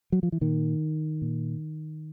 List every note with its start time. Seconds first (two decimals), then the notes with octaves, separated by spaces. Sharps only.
0.12 F#3
0.23 F3
0.32 E3
0.41 A#2 D#3
1.22 A#2